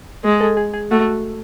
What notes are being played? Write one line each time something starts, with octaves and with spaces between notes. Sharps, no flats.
G#3
A4
G#4
G#4
A3 F#4